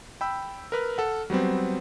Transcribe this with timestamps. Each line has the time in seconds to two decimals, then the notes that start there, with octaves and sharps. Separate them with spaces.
0.21 G5 B5 E6
0.72 A#4 B4 F6
0.98 A4 F#5
1.30 F#3 G3 B3 C4